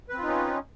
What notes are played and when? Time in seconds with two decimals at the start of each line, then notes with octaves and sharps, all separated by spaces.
0.09 B4
0.14 C4
0.18 F4
0.23 D#4
0.28 C#4